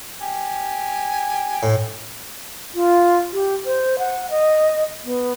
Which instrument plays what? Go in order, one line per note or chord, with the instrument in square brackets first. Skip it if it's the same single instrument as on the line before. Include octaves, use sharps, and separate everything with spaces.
[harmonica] G4 G#5
[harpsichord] A2
[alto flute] F4
G4
C5
F#5
D#5
B3